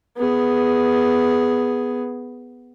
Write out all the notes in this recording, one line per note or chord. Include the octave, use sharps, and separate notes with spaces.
B3 G#4